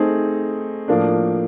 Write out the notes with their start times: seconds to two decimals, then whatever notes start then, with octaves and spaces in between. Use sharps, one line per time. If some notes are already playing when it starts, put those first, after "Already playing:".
Already playing: A3 C4 D#4 G#4
0.88 A2 F3 A#3 D4